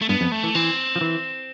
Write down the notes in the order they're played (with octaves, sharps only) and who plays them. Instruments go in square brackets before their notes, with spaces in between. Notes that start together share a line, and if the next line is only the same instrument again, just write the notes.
[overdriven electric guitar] A3
[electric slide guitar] G2 [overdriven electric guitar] B3
[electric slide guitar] F2
[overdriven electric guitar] A3
[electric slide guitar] E3
[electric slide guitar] E3 [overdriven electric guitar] C4
[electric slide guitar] F3
E3